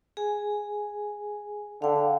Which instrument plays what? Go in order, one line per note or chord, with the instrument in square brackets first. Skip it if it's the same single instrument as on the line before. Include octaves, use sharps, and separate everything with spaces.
[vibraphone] G#4 G#5
[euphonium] D3 [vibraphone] F5 G5